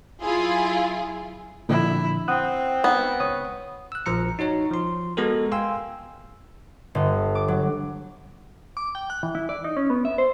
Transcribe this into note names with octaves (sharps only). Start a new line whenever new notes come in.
F#3 E4 F4 G#4
A#2 D3 F3 E4
C4 F#5 D#6 F#6
B3
C#2 C#5 D#6
E6 F#6
A#1 F3 A#5 C#7
D#4 F#4 C#5 A#5
F3 C6
G#3 B3 F#4 A4 A#4
F5 G5 G#5 C6 E6
G1
D6
F#3
D6
G5
F#6
E3
E4
D5
D#4
C#4
B3
E5
C5